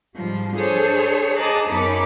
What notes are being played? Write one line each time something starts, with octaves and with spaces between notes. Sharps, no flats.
G#2 F3 G3
D4 G#4 A4 C5 C#5
G#4 D#5 A5 A#5 D6 F#6
F#2 B3 C#4 D#4 B5 D6